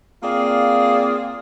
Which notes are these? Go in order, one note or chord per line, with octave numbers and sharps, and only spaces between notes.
A#3 C4 F4 G#4 D5 F5